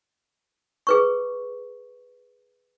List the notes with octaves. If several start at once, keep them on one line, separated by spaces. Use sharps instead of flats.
G#4 B4 C#6